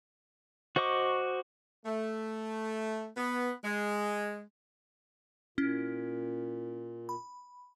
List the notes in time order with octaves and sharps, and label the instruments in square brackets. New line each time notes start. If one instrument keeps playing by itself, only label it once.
[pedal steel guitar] F#4 C5 D#5 C#6 D6
[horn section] A3
B3
G#3
[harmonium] A#2 [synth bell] C#4 E4
[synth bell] B5